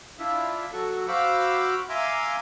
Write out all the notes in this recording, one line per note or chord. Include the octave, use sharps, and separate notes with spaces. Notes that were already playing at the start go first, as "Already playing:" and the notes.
D4 E4 F4 E5
F#3 F#4 A4 C#6
F#4 C5 F5 B5 D6 E6
E5 F5 G#5 A#5 C6 D6